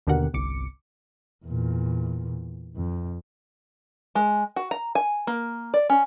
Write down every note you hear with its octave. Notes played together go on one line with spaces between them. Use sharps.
D#2 B2 D3 G4 A#4 F#5
G1 C2 D6 C#7
E2 A#2
F2
G#3
F#4
A#5
G#5
A#3
D5
C#4